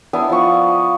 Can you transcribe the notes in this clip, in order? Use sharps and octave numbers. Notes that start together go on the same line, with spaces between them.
B3 D4 E4 G#5
F3 C#6